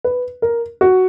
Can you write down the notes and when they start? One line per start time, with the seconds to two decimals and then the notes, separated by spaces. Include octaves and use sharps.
0.04 B4
0.42 A#4
0.81 F#4